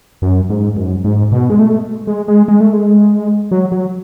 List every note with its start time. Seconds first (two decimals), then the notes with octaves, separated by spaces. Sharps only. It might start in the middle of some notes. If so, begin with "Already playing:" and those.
0.22 F#2
0.50 G#2
0.77 F#2
1.04 G#2
1.32 B2
1.50 G#3
1.59 A3
2.07 G#3
2.28 G#3
2.48 G#3
2.60 A3
2.73 G#3
3.51 F#3
3.72 F#3